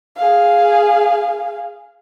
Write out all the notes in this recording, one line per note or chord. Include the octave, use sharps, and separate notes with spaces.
G#4 F5